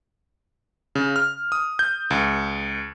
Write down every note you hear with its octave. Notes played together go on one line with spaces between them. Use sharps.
C#3
F6
D#6
G6
C#2